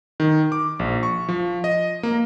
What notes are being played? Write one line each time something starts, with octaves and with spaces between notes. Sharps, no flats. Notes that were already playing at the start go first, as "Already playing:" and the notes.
D#3
D6
A#1
C#6
F3
D#5
A#3